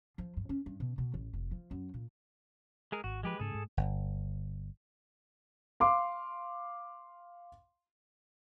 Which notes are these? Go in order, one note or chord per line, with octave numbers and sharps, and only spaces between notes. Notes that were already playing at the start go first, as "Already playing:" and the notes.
F3
G2
C#4
G2
B2
B2
A1
F1
F3
F#2
A#2
G#3 G#4 A#4
G#1 F#4
F3 G#3 G4 B4
G#2 C#3 G#4 A4
G#2
G1
F5 C6 D6